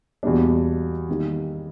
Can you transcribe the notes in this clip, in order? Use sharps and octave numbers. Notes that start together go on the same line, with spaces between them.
E2 B2 G3 A#3 D4
D#3 G3 A#3 D#4 G4